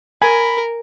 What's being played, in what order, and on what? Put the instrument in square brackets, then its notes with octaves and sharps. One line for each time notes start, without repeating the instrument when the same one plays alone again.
[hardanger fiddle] A#4 [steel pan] G#5 [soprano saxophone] B5